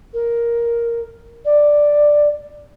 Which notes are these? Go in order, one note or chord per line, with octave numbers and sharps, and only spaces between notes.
A#4
D5